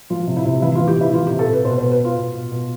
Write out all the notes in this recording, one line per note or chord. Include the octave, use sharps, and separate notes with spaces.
F3 F4
C3
E4
C3
E3 E4
E3 F4
G4
C3 E4
E3 F4
C3 G4
A4
C3 B4
B2 C5
B2 C5
B4
B2 F4
B2
B2
B2